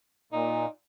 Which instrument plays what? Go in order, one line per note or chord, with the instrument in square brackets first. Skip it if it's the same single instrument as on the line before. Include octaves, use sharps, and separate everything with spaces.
[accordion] A#2 [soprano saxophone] D#4